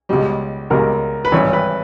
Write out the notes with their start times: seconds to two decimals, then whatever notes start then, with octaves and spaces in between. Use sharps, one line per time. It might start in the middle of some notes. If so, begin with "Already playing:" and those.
0.09 C#2 B2 G3
0.70 C#2 B2 G3 A#4
1.25 B4
1.32 G#1 G2 E3 C#5
1.53 B4